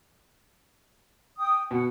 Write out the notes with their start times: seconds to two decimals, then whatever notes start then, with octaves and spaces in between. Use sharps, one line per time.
1.39 G5 D#6
1.71 B2 F#5